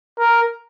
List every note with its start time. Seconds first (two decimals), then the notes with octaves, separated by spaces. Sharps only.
0.19 A#4